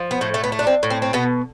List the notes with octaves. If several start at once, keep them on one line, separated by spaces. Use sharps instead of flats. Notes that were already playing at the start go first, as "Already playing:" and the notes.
Already playing: F3
B3
A2 A3
A3
B3
A3
D4
C4
A2
C4
C4
B2 B3